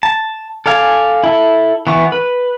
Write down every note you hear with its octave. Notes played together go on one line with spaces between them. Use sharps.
A5
A4 D5 F5 G#5
E4 A4
E3 B3 C#6
B4